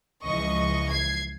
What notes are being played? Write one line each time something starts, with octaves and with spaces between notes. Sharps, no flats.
C#2 E3 F3 D#5 C#6
G#6 C7